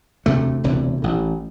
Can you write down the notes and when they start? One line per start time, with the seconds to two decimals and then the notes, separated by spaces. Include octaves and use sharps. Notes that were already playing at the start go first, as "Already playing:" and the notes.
0.26 E1 D2 C3 A3
0.64 E1 D2 C3
1.02 A1 A2